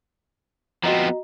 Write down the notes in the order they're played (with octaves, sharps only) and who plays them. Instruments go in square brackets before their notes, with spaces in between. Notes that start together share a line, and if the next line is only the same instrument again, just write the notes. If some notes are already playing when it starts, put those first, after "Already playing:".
[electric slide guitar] F3 B3 C4 [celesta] F#4 D#5 A#5